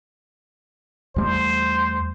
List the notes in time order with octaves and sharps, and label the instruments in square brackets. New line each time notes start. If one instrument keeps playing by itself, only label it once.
[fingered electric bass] E2 G3 A3 [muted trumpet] C5